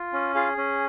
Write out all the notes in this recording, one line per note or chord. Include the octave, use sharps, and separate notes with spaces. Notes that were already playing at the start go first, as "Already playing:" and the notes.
Already playing: F4
C#4
F4 G#4 F5
C#4